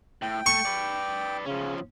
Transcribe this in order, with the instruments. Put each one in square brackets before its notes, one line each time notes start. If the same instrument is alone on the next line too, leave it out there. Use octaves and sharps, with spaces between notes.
[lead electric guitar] A2 [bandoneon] G5
[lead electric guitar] A3 [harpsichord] C#6
[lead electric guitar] B4 D5
[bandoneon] C#3 [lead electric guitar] F3 C#4